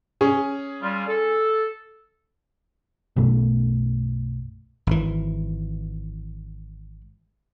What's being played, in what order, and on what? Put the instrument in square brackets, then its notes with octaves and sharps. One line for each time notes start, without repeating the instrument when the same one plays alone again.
[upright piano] C#4 G#4
[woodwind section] G3 F4
A4
[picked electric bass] B1 F#2 B2 A3
[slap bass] G#1 E3